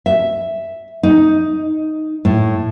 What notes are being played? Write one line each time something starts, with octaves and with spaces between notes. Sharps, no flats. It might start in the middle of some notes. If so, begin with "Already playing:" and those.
E5
D#4
A2